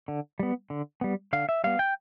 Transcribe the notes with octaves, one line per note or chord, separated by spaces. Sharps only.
D3
G3 B3
D3
G3 B3
D3 F5
E5
G3 B3 F5
G5